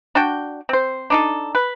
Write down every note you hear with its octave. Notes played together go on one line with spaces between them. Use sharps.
D4 F#4 G5
C4 C5
D4 D#4 A4
B4